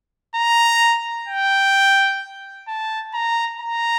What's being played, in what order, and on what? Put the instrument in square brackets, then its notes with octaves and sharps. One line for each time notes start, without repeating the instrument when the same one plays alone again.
[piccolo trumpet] A#5
G5
A5
A#5
A#5